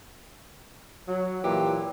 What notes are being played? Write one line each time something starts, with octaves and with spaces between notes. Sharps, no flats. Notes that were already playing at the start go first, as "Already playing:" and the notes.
F#3
A#2 E3 G4